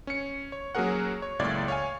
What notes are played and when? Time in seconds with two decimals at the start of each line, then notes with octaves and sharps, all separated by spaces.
0.07 C#4 C#7
0.52 C#5
0.75 F#3 A#3 C#4 G#4 A#4 F#5
1.22 C#5
1.39 C#2 F#2 A2 A#3 D5 G#6
1.68 C#5 F5 G#5